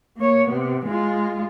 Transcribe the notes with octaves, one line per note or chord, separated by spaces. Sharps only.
A#3 C#5
C3 B3
G#3 F4